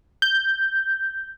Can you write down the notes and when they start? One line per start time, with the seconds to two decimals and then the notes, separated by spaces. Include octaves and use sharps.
0.22 G6